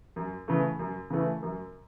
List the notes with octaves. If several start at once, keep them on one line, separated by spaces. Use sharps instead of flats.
F#2
C#3 E3 A3
F#2
C#3 E3 A3
F#2